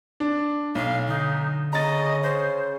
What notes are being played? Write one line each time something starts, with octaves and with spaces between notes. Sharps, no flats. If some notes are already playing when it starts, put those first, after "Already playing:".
D4
B1 F5
D3 D#4
C#3 D#5 A#5 A6
C5